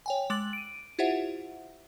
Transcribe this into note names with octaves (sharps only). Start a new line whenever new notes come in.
C#5 G5 G#5
G#3 D6 A6 F#7
D7 D#7
E4 F4 G4 C5 E5 F#5